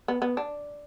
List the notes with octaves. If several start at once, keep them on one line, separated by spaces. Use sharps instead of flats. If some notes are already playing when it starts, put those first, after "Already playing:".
B3
B3
D4